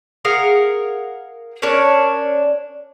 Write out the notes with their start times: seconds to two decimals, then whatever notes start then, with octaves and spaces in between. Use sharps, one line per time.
0.25 G#4 A#4 F5 F#5
1.62 C#4 D4 A#4 C#5